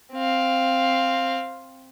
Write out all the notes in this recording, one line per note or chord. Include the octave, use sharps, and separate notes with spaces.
C4 F5